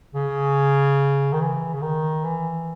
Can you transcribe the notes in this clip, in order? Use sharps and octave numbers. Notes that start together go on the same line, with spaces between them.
C#3
D#3
E3
C#3
D#3
E3